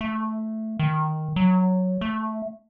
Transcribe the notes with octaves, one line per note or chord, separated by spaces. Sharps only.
A3
D#3
F#3
A3